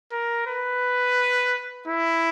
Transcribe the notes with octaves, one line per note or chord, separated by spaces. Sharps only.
A#4
B4
E4